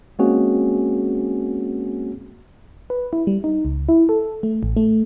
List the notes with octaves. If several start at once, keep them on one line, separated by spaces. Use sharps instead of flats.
G#3 A#3 C4 C#4 F#4 G#4
B4
E4
G3
D#4
C#2
E4
A4
A3
A1
A3